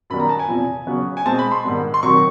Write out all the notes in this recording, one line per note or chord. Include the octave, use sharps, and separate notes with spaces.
F#2 D#3 G3 B3 B5
A#5
A5
G#5
E2 C3 F3
C#3 F#3 B3
G#5
B2 G#3 C4 A5
B5
C6
G#2 D#3 G3 B3
C6
C3 D#3 F#3 C#6